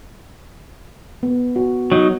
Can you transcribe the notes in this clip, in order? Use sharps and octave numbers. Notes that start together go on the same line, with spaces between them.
B3
F#4
F#3 D#4